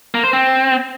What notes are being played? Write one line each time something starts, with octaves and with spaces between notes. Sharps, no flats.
A#3
C5
C4